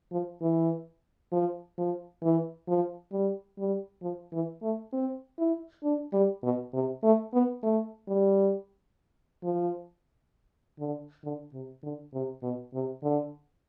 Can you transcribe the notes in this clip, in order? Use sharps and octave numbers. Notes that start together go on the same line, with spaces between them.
F3
E3
F3
F3
E3
F3
G3
G3
F3
E3
A3
C4
E4
D4
G3
B2
C3
A3
B3
A3
G3
F3
D3
D3
C3
D3
C3
B2
C3
D3